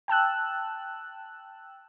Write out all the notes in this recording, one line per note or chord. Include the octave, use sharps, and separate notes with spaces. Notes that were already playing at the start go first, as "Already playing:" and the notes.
G5 A5 E6 F#6